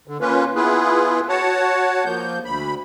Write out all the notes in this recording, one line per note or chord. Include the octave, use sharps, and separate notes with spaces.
D3
A#3 C#4 F4 B4
B3 E4 F4 G#4 B4
F#4 C#5 F#5 A5
F3 A#3 G6
D2 B5